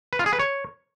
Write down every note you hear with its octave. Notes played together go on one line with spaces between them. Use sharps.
B4
F4
G#4
B4
C#5